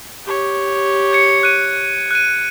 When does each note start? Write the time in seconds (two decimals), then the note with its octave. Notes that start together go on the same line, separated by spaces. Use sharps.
0.25 G4 C#5
1.13 G#6 C#7
1.43 F#6 D#7
2.11 F#6 D#7